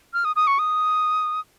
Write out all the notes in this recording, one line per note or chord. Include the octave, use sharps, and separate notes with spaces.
F6
D#6
D#6
C#6
D#6